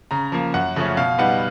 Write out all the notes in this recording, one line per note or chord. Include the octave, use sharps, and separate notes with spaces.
C#3 A#5
F3 A#3
F#2 F#5
C#3 F3 A3 C#4
B2 F5
G3 B3 D#4 F#5